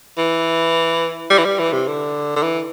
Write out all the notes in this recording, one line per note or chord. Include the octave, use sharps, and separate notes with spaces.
E3
G3
E3
G3
E3
C3
D3
D3
E3